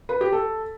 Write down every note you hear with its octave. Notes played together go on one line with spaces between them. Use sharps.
B4
G4
A4